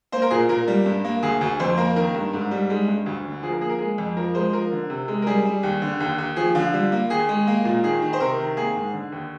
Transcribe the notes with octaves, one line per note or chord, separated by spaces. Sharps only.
A#3 C5
A#4
A#2 G#4
A#2 A#4
G3
G2
A#3
D2 G#4
D2
F2 C5
A#3 A#4
D#3 A#4
G2
G#2
G3
G#3
G2
D2
D3
F3 G#4
A#4
A#3 G#4
A#4
G#3 G#4
F2
F3 A#4
G#3 C5
F3 A#4
D3
C3
G#3
A#4
G3 G#4
G3
D#2
D3
D#2
D#2
F3 G#4
D3 F4
G3
A#3
D#2 G#4
G#3
A#3
A#2
D#3 G#4
D#3
C5
C3 A#4
D#3
A#3 G#4
G#2
D3
D#2